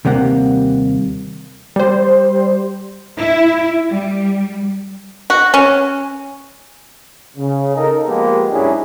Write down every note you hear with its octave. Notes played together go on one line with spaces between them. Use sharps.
D#2 C3 G3 A#3 F#5
G3 C5
E4
G3
F#4
C#4
C#3
D#4 A4 A#4 D#5 A#5
F3 G#3 A#3 B3 G4
G#2 F#3 C#4 D4 E4 G#4